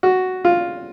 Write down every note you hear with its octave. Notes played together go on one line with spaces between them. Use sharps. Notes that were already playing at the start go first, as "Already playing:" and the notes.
F#4
F4